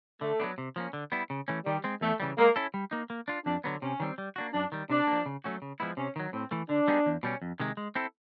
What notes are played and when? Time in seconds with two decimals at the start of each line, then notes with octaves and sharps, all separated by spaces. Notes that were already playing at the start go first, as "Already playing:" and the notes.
0.21 D3 A3
0.40 F#3 B3 D4
0.58 C3
0.76 F3 A#3 C#4
0.93 D3
1.12 G3 B3 E4
1.30 C#3
1.48 E3 A3 C#4
1.66 D#3 G3
1.84 G#3 C4
2.01 E2 A3
2.20 C#3 E3 G3
2.38 G#3 A#3
2.56 C#4 E4 A4
2.74 G3
2.91 A#3 D#4
3.10 A#3
3.28 D4 F4
3.46 F2 D4
3.64 D3 F#3 B3
3.82 C3 C#4
4.00 D#3 G3 C4
4.18 G3
4.36 A#3 D4 F#4
4.54 F#2 D4
4.72 D#3 G3
4.90 C3 D4
5.07 F3 A#3
5.26 C#3
5.44 F#3 A3 C#4 F#4
5.62 C#3
5.80 F3 G#3 B3 E4
5.97 C3 C#4
6.16 D#3 F#3
6.33 A2 C4
6.51 E3 A3
6.69 D3 D4
6.88 G3 B3 D#4 G#4
7.06 E2
7.23 B2 G3 A#3 C#4
7.42 F2
7.60 C3 D#3 G#3
7.77 G#3
7.95 C4 E4 A4